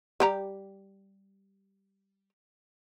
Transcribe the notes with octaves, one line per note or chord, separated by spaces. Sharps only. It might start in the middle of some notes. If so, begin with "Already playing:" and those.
G3 G4 A#5